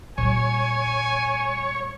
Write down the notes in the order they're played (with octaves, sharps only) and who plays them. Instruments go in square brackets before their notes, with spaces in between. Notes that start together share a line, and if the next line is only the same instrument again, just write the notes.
[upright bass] A#2 G3 [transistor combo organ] C#5 [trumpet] G#5